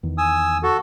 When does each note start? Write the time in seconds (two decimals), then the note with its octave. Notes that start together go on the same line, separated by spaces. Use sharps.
0.03 E2 D#3
0.18 G#5 D#6 E6
0.63 F#4 A4